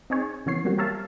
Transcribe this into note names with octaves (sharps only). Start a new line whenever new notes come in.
C4 D#4 G#4 C#5
C#3 E3 B3 C#5 C7
F#3 G3 A#3 C4 F#4
G4 A#4 C#5 E5 F5 A5